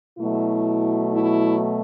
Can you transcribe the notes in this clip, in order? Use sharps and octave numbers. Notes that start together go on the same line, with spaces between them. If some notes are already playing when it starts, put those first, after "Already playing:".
B2 F#3 A3 E4
E4